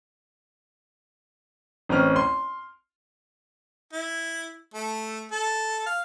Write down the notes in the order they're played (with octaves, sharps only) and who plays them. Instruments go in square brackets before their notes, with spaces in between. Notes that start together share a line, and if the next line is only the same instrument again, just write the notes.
[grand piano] A1 C4 C#4 F6
C6
[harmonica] E4
A3
A4
F5